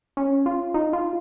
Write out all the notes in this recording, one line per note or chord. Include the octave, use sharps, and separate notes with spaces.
C#4
F4
D#4
F4